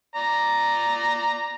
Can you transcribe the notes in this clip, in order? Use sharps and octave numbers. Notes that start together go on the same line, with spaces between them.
D5 A#5